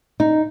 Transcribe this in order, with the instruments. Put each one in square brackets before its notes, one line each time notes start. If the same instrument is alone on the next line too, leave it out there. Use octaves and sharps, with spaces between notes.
[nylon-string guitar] D#4